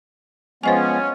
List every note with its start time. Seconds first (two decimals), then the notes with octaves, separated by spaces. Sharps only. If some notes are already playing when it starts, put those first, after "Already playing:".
0.63 F3 G#3 B3 C#4 C5 D#5 G#5